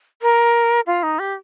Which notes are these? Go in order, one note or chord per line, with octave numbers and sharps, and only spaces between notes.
A#4
F4
D#4
G4